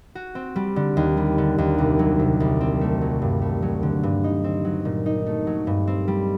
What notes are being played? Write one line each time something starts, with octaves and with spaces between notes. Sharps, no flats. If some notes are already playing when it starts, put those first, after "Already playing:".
F#4
C4
G3
D3
D#2
G3
D3
D#2
C2
F#3
C3
C2
C4
A3
F#3
G2
A3
F#3
D3
G2
D#4
C4
F#3
A#2
D#4
A3
F#3
G2
C4
G3